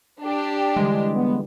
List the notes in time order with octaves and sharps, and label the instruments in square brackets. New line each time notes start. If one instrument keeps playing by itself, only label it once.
[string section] D4 G4
[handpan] D3 E3 G3 [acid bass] G#3
[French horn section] B3